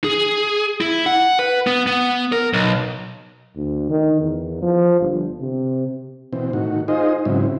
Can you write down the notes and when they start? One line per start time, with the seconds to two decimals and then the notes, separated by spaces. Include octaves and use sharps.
0.04 G#4
0.81 E4
1.06 F#5
1.39 B4
1.67 B3
1.87 B3
2.32 A#4
2.53 B1
3.56 D2
3.90 D#3
4.21 E2
4.62 F3
5.01 G1
5.41 C3
6.33 B2 E3 C4
6.53 A2 D#3 F#4
6.88 D#4 F4 G#4 C5 D#5
7.25 G#2 C#3 F#3 C4 E4